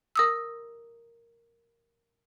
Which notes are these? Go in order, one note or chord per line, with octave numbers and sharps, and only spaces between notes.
A#4 D#6 E6